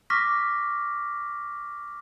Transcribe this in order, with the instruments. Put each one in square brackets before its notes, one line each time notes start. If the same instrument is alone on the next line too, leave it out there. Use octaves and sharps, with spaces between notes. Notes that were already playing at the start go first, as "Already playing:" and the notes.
[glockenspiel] C#6 D6 F6 A#6 B6